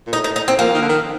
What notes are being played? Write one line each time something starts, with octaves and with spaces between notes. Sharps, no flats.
A#2
A2 D#4
D#4
D#4
C4
F3 A#3
D#3
D3
D#3